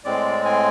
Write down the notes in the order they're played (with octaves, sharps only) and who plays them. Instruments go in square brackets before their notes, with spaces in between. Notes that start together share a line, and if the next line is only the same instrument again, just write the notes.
[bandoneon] A2 G#3 C4 D5
G#5